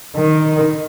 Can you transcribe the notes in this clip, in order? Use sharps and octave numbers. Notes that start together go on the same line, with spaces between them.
D#3